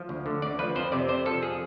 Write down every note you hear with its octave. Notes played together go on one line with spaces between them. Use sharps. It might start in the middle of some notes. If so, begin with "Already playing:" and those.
Already playing: F3
D2
D3
D2 D5
F3 B4
F2 C5
C3 D5
F2 C5
F3 A4
G#4